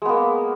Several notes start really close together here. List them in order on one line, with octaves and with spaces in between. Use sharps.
G#3 B3 A#3